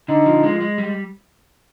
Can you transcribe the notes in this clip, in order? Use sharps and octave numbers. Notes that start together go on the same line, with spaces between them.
D3 D#4
F3
G#3
G#3
G3